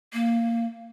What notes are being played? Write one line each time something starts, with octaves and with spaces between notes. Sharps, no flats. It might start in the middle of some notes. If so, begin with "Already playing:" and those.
A#3